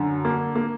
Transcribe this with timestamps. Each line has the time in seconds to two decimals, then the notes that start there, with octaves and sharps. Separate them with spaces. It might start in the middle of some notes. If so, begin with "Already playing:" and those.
Already playing: F#2 D3
0.25 A#3
0.56 A#3